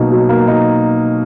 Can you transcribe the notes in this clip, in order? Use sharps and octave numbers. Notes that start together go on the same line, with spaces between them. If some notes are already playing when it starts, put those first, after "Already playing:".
Already playing: B2 F#3 A#3 D#4
F#3
A#3
D#4